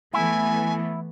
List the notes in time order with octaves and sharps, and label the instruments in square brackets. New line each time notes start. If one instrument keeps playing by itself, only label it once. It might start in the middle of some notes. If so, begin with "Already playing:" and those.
[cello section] E3 A3 B3 [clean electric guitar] E4 [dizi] G#5